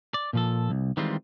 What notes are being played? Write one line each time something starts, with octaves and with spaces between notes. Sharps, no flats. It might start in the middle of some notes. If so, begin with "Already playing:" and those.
D5
A#2 F3 A4
C2
D#3 E3 G3 G#3 C4 F4